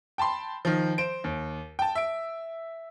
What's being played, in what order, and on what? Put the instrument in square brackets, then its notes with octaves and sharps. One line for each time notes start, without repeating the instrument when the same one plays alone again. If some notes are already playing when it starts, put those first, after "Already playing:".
[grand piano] G5 A5 B5 C6
D#3 F3
C5 D7
D#2
G5 A5
E5 D7